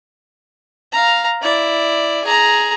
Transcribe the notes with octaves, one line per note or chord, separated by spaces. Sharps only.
F5 A#5
E4 D5
G#4 A#5